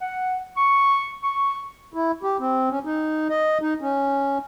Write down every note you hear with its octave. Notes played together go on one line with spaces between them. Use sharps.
F#5
C#6
C#6
E4
G4
C4
C#4
D#4
D#5
D#4
C#4